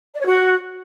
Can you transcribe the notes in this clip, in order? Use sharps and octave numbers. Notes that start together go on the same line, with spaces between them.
D5
C#5
F#4